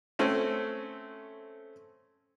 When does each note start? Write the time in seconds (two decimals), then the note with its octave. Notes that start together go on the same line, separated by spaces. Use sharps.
0.19 A3 C4 C#4